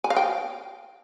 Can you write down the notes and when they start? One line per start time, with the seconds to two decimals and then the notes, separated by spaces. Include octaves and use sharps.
0.04 G#5
0.10 F5
0.16 G5